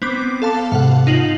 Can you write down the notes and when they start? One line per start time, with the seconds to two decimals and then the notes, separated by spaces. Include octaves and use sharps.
0.02 B3 C4 D6
0.42 A4 F5 A5
0.72 G#2 C3 F5 F#5
1.07 D#4 F4 F#7